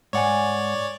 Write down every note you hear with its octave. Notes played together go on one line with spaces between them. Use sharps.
G#2 C#5 D5 F#5 G#5